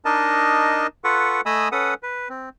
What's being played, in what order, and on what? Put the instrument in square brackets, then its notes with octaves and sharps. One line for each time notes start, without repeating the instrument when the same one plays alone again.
[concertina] D4 D#4 A#4 D#5 A5
F4 A4 B4 F#5 C#6
A3 D#5 G#5 B5 D#6 E6
C#4 A4 B4 F#5 D#6
B4
C4